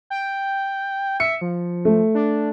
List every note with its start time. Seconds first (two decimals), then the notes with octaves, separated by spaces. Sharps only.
0.10 G5
1.20 E5 C#7
1.41 F3
1.85 A3
2.15 D4